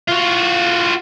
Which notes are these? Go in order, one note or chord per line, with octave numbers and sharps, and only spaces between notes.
F4 F#4